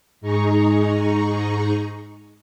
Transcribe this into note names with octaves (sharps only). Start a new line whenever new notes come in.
G#2 D#4 G#4 A#5 C#6